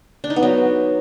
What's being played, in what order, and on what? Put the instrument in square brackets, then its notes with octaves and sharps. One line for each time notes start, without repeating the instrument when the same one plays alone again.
[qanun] D4
D#4
B3
F#3